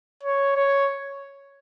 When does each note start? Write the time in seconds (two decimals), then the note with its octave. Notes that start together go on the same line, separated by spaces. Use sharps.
0.23 C#5
0.56 C#5